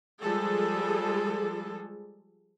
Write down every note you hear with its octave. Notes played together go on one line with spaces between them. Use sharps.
F3 G3 G#3 G#4 A4